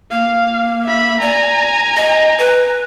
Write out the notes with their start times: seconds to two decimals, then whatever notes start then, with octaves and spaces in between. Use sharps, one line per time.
0.11 A#3 F5
0.84 E5 B5
1.21 D5 G#5 A#5
1.97 D#5
2.38 B4